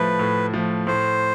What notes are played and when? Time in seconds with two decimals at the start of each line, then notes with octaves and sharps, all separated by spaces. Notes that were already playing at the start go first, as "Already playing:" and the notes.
Already playing: A2 F3 A3 B4
0.19 A2
0.54 F3 A3
0.87 A2 C5